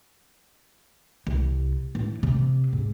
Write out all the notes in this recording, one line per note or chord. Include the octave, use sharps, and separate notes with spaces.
C2
A2
C3
G#2